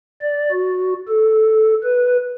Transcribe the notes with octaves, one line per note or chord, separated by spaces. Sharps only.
D5
F#4
A4
B4